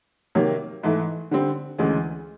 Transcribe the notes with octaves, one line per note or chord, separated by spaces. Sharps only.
C3 D#3 F#3 A#3
G#2 E3 A3
D3 G3 C4
D2 C#3 E3 G#3